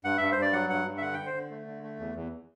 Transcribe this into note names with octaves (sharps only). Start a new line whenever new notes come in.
G2 F#5
G2 E5
C5
G2 D5
F#3 F#5
G2 F#5
G2
E5
D3 F#5
D3 G5
C5
D3
A3
D3
A3
E2
E2